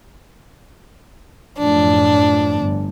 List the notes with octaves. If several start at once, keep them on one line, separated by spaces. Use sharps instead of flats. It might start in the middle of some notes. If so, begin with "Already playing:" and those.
F#2 A2 F3 D4
G1